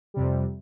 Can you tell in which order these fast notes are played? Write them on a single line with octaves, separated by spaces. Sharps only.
G3 C3 F2